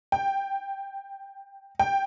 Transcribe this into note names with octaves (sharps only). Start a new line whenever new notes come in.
G5
G5